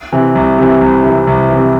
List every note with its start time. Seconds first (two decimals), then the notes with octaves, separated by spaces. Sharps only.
0.13 C3 E3
0.35 C2
0.58 C3 E3
0.81 C2
1.04 C3 E3
1.27 C2
1.50 E3
1.56 C3